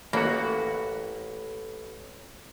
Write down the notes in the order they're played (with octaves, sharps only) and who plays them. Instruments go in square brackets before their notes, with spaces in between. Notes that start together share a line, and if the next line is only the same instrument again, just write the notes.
[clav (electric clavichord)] A1 F#4 [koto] A#3 [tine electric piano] A4 C#5 B5